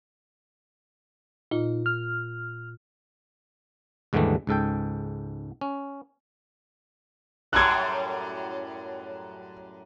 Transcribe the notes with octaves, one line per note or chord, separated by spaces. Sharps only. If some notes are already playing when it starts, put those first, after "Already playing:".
A#2 D#4 F4
F6
D#2 G#2 D3 E3 G3 A3
C#2 G#2 A4 G5
C#4
F#2 A2 G3 F#6 G#6